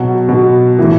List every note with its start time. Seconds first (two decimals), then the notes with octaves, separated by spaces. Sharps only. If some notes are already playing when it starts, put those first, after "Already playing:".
Already playing: B2 F#3
0.29 B2
0.79 A2 E3